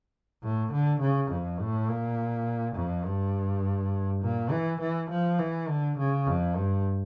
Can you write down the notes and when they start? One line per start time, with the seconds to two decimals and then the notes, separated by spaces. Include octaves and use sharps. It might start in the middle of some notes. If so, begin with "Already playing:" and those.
0.43 A2
0.72 D3
1.01 C#3
1.31 F2
1.60 A2
1.88 A#2
2.75 F2
3.05 G2
4.22 A#2
4.51 E3
4.80 E3
5.10 F3
5.39 E3
5.68 D3
5.98 C#3
6.27 F2
6.56 G2